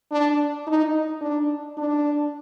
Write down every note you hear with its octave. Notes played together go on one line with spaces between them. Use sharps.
D4
D#4
D4
D4